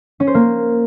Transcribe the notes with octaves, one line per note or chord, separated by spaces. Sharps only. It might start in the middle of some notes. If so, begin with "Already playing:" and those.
C#4
C5
A#3